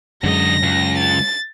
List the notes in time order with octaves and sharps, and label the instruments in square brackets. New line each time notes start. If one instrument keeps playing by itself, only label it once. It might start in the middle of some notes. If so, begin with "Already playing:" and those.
[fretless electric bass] F#2 G#3 [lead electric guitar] D3 D#5 [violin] A#6
[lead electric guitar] C#2
[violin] A6